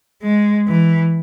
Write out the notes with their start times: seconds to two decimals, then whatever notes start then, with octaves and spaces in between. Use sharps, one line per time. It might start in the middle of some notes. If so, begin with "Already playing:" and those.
0.23 G#3
0.68 E3